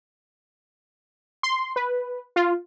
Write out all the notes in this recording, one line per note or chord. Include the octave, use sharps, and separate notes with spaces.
C6
B4
F4